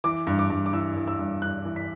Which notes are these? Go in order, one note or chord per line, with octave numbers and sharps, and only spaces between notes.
E3 D6
G2
D6
G2
D6
E3 E6
E3
E6
G2
G2 F#6
E3
B6